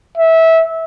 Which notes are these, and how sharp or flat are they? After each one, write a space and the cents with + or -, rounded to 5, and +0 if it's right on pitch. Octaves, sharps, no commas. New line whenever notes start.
E5 -20